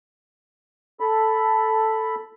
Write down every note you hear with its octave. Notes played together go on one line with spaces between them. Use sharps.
A4 B5